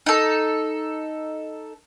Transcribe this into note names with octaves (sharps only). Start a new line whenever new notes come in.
D#4 A4